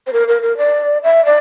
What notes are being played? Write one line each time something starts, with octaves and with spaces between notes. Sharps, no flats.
C5
A#4
A#4
A#4
D5
E5
D5